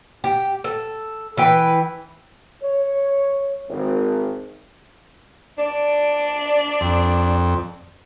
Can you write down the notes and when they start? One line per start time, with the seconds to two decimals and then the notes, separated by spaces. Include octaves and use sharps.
0.24 G4
0.64 A4
1.37 E3 B4 G5
2.62 C#5
3.69 G#1
5.58 D4 D5
6.81 F2